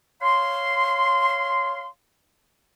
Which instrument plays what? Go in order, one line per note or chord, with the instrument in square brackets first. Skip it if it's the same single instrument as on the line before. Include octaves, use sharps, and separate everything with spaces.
[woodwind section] C#5 F5 C6